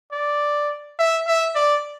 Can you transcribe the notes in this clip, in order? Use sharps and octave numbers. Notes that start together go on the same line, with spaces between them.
D5
E5
E5
D5